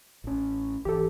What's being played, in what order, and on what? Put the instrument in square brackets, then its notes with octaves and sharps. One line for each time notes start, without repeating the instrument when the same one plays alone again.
[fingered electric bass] A1 C#4
[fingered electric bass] G#1 E3 [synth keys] G4 A4